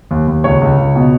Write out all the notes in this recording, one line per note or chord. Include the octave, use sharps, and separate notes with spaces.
D#2
D#2
C#2 C#5
C#2
C#2
B2